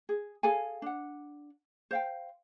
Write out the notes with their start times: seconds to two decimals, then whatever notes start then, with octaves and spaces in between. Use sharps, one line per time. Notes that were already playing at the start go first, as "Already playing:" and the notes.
0.09 G#4
0.43 G#4 A4 F5 G#5
0.82 D4 F#5
1.91 C5 F5 G5